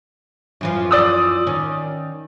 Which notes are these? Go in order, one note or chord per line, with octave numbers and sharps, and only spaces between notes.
F#2 E3 F3
D5 D#6 E6
D#3 C#4